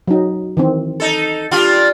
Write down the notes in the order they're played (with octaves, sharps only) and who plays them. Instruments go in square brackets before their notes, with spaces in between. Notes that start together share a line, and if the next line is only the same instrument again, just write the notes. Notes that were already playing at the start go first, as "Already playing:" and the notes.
[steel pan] F#3 D#4
D#3 E3 C4
[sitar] D#4 A4
G3 D4 F4